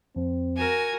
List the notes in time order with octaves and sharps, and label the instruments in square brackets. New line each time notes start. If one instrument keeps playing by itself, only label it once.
[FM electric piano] F2 [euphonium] C4
[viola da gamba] F#4 A#4 [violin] G#5